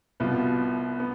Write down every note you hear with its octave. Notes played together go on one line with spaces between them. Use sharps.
C2 B2 B3 F4
B3